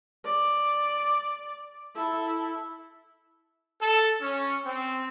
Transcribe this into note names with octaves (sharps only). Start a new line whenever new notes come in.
D5
E4 A4
A4
C#4
C4